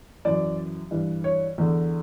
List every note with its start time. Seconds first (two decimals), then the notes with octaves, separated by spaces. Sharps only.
0.25 F#2 E3 D5
0.91 G2 E3
1.24 C#5
1.58 E2 D3